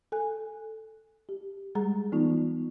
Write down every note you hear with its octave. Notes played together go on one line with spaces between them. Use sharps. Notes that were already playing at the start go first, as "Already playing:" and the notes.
A4 G#5 F#6
G4
G3 G#3 G#4 A#5
E3 B3 D#4 F4